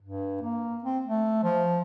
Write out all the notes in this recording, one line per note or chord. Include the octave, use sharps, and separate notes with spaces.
G2
A#3
C4
A3
F3